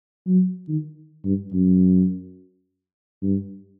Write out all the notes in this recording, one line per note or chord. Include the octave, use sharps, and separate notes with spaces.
F#3
D#3
G2
F#2
G2